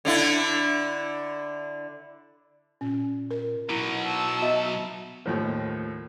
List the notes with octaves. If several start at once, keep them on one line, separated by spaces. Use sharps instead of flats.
D3 D4 E4
A#2 C#4
A#4
B2 F#3 E4 A#5
A5 E6
B3 F#4 D#5 E5
D#2 A2 F3